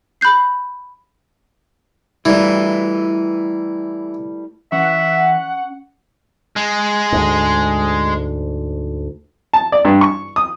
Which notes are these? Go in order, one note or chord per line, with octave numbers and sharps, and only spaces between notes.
B5 F#6 G6 C7
E3 G3 A3 E4 A#4 B4
E3 C#4 E5 F#5
G#3
D2 G#2
A5
D5
G2
C#6
D#6